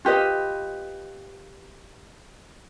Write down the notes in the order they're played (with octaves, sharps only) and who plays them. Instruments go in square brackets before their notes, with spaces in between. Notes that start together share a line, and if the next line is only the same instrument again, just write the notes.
[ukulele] F4 G4 B4 D#5